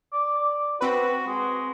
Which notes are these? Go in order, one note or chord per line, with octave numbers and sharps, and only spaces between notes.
D5
D5
C4 F#4 B4
G#3